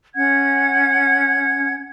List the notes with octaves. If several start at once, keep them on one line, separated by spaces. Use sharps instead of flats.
C#4 F#5 G#6